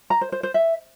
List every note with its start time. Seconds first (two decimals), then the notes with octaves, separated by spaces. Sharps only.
0.10 A#5
0.21 C5
0.32 C5
0.43 C5
0.54 E5